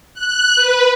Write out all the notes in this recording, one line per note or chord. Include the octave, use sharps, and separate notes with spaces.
F#6
B4